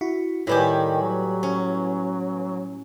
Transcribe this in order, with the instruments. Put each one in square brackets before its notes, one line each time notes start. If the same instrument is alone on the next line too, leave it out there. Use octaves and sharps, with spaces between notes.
[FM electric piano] E4 F#4
[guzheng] A2 G3 G4 [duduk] D#3 [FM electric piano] E4 B4 G#5
[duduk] F#3
[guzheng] C#4